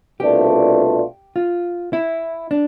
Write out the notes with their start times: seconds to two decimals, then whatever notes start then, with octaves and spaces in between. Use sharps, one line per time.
0.20 C2 B2 A3 D4 F4 G4
1.36 F4
1.93 E4
2.51 D4